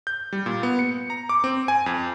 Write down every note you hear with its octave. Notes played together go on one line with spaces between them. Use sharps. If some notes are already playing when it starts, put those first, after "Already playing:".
G6
G3
A#2
B3
C#7
A#5
D6
C4
G#5
F2